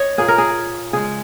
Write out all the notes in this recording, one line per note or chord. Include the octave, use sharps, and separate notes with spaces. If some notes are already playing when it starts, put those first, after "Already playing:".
Already playing: C#5 D#5
A#2 A#3 G#4
A#4
G#4
C#3 G#3 G#4